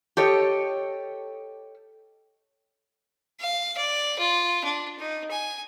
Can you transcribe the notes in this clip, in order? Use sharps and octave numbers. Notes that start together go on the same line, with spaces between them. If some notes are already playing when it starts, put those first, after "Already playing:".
G4 A4 C#5 D#5
F5
D5
F4
D4
D#4
G#5